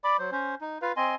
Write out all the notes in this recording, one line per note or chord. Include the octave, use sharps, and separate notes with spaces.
D5 B5 D6
F#3 C5
C#4 C5
D#4
F4 B4 F5
C4 D#5 G#5 C6